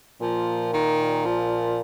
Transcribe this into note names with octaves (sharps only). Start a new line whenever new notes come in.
A#2 F3
D#3
F3